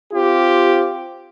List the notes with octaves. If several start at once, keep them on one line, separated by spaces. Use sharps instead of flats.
C4 F4 G4